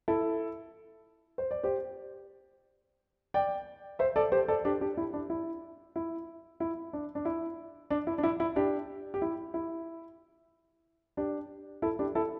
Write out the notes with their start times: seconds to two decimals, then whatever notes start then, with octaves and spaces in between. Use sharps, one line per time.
0.08 E4 A4
1.38 C5
1.51 D5
1.63 G4 C5
3.34 D5 G5
3.99 C5 E5
4.16 A4 D5
4.32 G4 C5
4.48 A4 D5
4.65 D4 G4
4.81 D4 G4
4.97 E4
5.14 D4
5.30 E4
5.96 E4
6.60 E4
6.93 D4
7.15 D4
7.25 E4
7.90 D4
8.07 E4
8.18 D4
8.23 E4
8.40 E4
8.56 D4 G4
9.14 G4
9.22 E4
9.54 E4
11.17 D4 G4
11.82 E4 A4
11.99 D4 G4
12.15 E4 A4